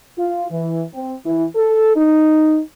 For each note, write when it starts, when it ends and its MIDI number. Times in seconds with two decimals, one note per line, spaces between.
0.18 0.45 65
0.51 0.83 52
0.93 1.15 60
1.25 1.45 52
1.55 1.94 69
1.95 2.60 63